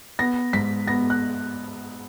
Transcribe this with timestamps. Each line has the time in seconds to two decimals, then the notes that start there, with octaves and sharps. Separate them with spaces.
0.19 B3 A#6
0.53 G#2 B6
0.87 B3 A#6
1.10 F#6